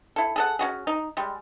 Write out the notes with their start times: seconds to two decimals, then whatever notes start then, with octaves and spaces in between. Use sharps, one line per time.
0.16 E4 A4
0.36 G#4 A4 F#5
0.59 C#4 F#4 G#4
0.87 D#4
1.17 G3 G#3